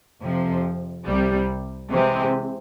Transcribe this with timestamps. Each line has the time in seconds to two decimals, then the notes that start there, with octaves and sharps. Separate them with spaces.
0.23 F2 C3 F3
1.07 C2 C3 G3
1.90 C3 E3 G#3 C4